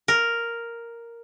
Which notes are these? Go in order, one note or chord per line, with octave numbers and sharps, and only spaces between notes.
A#4